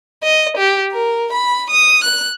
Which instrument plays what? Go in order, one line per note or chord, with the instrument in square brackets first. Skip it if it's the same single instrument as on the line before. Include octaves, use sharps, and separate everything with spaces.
[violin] D#5
G4
A#4
B5
D#6
F#6